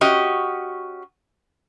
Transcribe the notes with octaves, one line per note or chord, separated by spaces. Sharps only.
C#4 F#4 G4 D#5